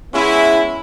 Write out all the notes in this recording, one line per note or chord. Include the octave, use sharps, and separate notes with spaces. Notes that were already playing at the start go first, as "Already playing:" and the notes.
G#3 B3 C#4 E4